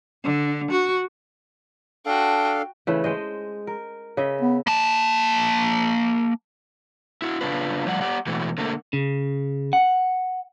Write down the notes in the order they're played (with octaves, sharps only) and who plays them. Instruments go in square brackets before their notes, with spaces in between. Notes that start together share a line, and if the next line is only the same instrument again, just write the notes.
[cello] D3
F#4
[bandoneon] D4 A4 F5 [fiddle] F#4 G5
[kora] C#3 E3 A3
G#3 C5 D#5
A#4
C#3 D#5 E5
[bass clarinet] B3
[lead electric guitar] A#3 A5
[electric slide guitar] E4 F#4
C#3 D4 F4 B4
A2 F3 G3 D5 F#5
G4 D5 F#5
B2 E3 A3 F#4
D3 A3 A#3
[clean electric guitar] C#3
F#5